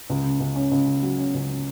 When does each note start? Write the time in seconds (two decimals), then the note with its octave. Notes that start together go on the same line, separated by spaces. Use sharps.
0.10 C#2
0.25 C#3
0.40 C#2
0.56 C#4
0.71 C#2
0.87 C#3
1.03 F#3
1.18 C#4
1.34 C#2
1.49 C#4